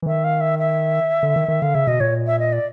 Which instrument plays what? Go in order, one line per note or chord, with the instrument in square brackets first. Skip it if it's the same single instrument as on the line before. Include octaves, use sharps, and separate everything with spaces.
[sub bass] E3
[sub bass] D#3 [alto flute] E5
[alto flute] F5
E5
E5
[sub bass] D3
D#3
D#3
[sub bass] D3 [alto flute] F5
[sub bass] C#3 [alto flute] E5
[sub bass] B2 [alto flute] D#5
[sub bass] A#2 [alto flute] C#5
[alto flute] E5
D#5
D5